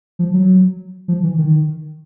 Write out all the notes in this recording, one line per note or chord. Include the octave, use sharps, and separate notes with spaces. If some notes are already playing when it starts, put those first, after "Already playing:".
F3
F#3
F3
E3
D#3